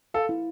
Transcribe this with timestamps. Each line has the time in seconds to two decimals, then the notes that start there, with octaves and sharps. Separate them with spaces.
0.14 A4 F5
0.29 E4